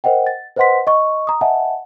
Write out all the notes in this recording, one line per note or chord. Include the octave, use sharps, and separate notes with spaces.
A#4 C5 D#5 F#5 G5
A6
B4 C5 D#5 F#5 C6 B6
D#5 C#6
A#5 D#6
D#5 E5 F#5 G#5 A5